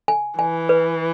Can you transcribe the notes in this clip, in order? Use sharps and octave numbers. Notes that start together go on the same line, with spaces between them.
G#5
E3 G#5
B4